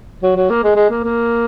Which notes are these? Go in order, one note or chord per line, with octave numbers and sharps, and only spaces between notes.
F#3
F#3
A#3
G#3
G#3
A#3
A#3